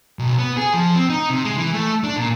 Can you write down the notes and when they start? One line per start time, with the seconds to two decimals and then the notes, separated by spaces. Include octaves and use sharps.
0.19 B1
0.39 B3
0.57 G#4
0.74 F3
0.95 C4
1.10 D#4
1.30 C3
1.45 G#3
1.57 E3
1.74 A3
2.04 D4
2.17 A#2